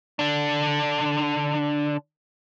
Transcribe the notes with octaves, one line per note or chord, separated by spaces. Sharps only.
D3 D4